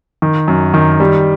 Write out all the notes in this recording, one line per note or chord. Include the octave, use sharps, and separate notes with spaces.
D#3
F#2
D#3
G3